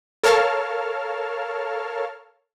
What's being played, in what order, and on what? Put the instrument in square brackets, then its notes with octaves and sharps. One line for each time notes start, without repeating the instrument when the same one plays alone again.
[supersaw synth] A4 A#4 C#5 F5 A5 F6